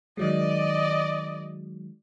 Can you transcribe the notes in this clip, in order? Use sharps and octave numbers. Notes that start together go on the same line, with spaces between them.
D#3 F#3 G#3 D5 D#5